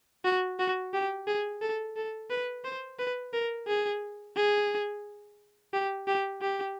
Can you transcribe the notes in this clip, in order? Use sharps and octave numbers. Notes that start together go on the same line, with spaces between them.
F#4
F#4
G4
G#4
A4
A4
B4
C5
B4
A#4
G#4
G#4
G4
G4
G4